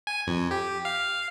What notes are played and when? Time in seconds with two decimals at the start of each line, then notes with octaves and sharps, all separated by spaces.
0.07 G#5
0.27 F2
0.51 G4
0.85 F5